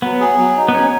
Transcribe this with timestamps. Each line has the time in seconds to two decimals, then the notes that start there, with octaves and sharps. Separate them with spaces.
0.02 F#3 B3
0.20 G#4
0.39 F#3
0.57 D#4
0.68 B3
0.74 F#3 C#4